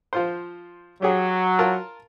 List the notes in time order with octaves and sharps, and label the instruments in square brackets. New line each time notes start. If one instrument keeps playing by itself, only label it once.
[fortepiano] F3 F4 C5
[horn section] F#3 [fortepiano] G4 G#4
[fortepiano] F4 A#4 A5